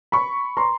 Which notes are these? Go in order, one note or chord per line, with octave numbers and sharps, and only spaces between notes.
B5 C#6
A#5 C6